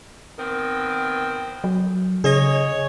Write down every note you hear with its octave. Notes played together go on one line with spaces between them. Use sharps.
D#3 B3 C4
F#3
C#3 G#4 C#5 D#5